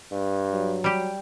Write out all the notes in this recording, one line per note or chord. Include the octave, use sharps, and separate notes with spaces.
G2
F#3
G3 G4